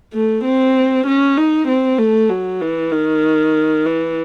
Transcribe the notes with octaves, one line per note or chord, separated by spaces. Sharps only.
A3
C4
C#4
D#4
C4
A3
F#3
E3
D#3
E3